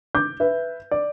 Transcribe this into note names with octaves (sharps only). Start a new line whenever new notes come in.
D6 G6
B4 E5
D5